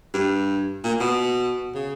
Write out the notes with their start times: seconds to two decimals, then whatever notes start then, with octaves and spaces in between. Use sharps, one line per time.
0.14 G2
0.84 A#2
1.00 B2
1.75 C#3